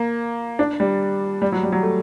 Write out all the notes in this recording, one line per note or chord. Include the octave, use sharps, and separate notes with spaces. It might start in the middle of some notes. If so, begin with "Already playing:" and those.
Already playing: A#3
D4
G3
G3
F#3
G3
F#3
A3